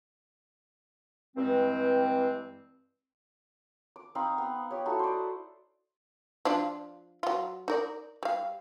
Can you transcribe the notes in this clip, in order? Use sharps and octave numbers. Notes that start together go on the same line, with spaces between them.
G2 E3 G#3 C4
D6
C4 D#4 F5 B5
B3
G4 C#5
D#4 E4 F#4 A4
C5 D5
F3 D4 F4
F#3 F4
D#4 A#4 D5
G3 F5